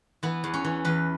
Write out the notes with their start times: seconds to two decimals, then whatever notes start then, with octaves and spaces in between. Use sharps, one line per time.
0.23 E3 B3
0.44 E2
0.54 C#4
0.65 E3
0.85 E2 B4